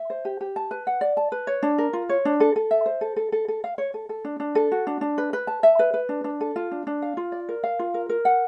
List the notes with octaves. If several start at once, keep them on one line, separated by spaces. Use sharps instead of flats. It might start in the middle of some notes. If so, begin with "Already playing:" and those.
Already playing: E5
C5
G4
G4
A5
B4
F#5
D5
A5
B4
C#5
D4
A#4
F4
C#5
D4
A4
A4
E5
C5
A4
A4
A4
A4
F5
C#5
A4
A4
D4
D4
A4
F#4
D4
D4
B4
B4
A5
E5
B4
B4
D4
D4
A4
F4
D4
D4
F5
F4
D5
A#4
F5
F4
A#4
A#4
F#5